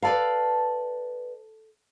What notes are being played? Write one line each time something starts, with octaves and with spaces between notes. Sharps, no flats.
A4 B4 D5 F5